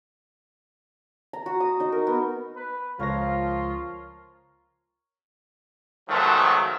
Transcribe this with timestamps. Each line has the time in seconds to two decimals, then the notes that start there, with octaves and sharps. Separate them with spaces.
1.33 A#5
1.46 F#4
1.60 D#6
1.80 D#4 D#5
1.92 A#4
2.07 B3
2.56 B4
2.99 C#2 F3 F4 A#4 C#5 F5 A#6
6.09 G#2 B2 D#3 F3 F#3 A3